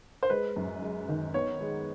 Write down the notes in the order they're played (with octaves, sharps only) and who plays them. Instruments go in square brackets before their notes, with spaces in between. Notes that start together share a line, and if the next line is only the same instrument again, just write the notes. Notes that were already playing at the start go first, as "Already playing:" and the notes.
[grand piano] C5
[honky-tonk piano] G#3 [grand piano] B4
[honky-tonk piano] F#2
G#3
D#3
[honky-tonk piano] B3 [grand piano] C#5
[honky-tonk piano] G#3